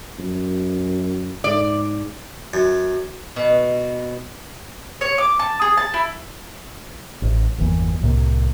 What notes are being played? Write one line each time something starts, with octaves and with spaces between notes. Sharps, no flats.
F#2
G#2 D5
F#2
B2
C#5
D6
A5
G#4
A5
E4
A1
G1 E2 E3 A#3
C2 A2 C3 A#3